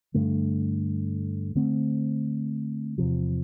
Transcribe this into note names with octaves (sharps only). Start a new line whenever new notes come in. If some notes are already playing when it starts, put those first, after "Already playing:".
G2 D3 A3
D3 A3 C4
E2 C3 F3